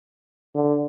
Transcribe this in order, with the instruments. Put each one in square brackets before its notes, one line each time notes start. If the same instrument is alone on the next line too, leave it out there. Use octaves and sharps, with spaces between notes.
[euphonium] D3